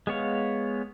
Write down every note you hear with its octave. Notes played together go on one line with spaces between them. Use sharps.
G#3 B3 C#5 F5